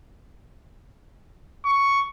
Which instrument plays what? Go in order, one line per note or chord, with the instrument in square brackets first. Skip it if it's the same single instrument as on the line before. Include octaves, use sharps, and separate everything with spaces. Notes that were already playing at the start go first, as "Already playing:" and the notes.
[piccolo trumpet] C#6